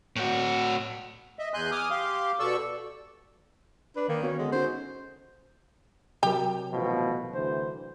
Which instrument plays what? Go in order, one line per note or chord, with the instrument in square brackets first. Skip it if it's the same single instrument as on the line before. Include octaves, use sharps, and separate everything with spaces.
[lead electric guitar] A2 F#4
[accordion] D#5 E5
E2 G#5 C6 F#6 G6
G#5 D6 D#6 F6
G4 F5 C6 D6
B2 A4 D5 C#6 E6
[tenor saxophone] D4 [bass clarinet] B4
[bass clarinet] D#3 [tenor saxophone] A#3
[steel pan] B3 F#4 [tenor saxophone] C#4
[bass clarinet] D3 [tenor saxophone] G#3
[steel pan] C#4 D#4 F#4 [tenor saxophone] C5
[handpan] C3 F#3 A#4 [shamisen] G4
[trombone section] A1 B2 F3
D2 E3 C5